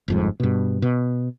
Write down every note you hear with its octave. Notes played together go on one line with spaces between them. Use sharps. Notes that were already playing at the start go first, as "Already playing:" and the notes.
G1 F2 G#2
G2 B2
B2